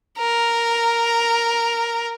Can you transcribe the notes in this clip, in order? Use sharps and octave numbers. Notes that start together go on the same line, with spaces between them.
A#4